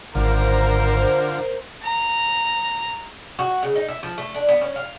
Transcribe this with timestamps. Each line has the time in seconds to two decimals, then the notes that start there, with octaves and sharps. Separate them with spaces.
0.15 G#1 D3 F4 A#4 C5
1.83 A#5
3.39 F#4
3.63 C#3
3.76 D#4
3.89 E4
4.03 F3
4.18 A3
4.35 D4
4.49 B3
4.61 C#4
4.76 F5